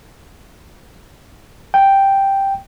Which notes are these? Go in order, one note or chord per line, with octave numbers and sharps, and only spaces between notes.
G5